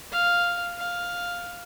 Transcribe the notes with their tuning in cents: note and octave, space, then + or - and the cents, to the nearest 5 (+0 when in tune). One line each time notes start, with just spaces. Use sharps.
F5 +0
F5 +5